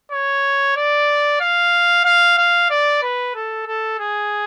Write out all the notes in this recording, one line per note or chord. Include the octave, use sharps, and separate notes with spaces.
C#5
D5
F5
F5
F5
D5
B4
A4
A4
G#4